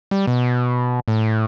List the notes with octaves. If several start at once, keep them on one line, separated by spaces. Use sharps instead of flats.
G3
B2
A2